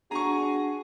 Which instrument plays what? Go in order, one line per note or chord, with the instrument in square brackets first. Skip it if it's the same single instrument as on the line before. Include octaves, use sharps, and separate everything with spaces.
[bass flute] D4 [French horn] F#4 [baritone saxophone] G#4 [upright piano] A#5 C#6